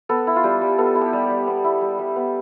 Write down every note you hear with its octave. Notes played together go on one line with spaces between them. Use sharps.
B3 A4
E4
F4
G3 G4
G3
B3 A4
E4
G4
G3
D5
G3
B3
E4
G3
G3
B3